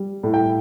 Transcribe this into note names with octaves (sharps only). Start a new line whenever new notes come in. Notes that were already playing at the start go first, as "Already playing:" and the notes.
Already playing: G3
A2
G5